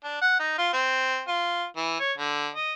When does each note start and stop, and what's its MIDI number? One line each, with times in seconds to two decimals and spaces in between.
0.04 0.21 62
0.21 0.39 78
0.39 0.55 63
0.58 0.71 65
0.73 1.21 60
1.28 1.64 65
1.77 1.97 52
2.00 2.12 73
2.18 2.49 50
2.55 2.73 75